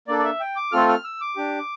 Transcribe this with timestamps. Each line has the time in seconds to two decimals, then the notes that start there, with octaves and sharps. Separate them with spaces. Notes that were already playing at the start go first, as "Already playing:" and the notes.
0.08 A#3 D4 A4 D5
0.19 D5
0.24 E5
0.40 G5
0.56 D6
0.72 A3 C4 F4 A4 F6
0.89 F6
1.04 E6
1.21 D6
1.36 D4 G4